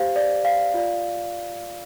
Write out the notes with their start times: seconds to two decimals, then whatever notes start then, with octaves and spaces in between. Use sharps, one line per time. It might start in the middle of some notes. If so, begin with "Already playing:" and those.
Already playing: G4 C5 F5
0.16 D5
0.45 F5
0.74 F4 D5